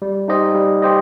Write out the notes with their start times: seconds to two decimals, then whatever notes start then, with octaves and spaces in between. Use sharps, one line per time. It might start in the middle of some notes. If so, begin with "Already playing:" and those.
0.02 G3
0.28 D#4 G4 C5 D#5
0.55 G3
0.82 G4 C5 D#5